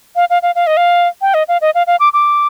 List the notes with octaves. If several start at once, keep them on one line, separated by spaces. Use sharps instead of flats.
F5
F5
F5
F5
D#5
F5
G5
D#5
F5
D#5
F5
F5
D6
D6